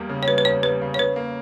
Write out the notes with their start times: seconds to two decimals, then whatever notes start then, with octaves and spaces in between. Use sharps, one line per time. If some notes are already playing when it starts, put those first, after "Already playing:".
Already playing: E2 G3 A#3
0.10 C#3
0.23 C#5
0.28 G3 B4
0.38 B4
0.45 E2 C#5
0.63 G3 B4
0.81 C#3
0.94 C#5
0.98 C#3 B4
1.16 A#3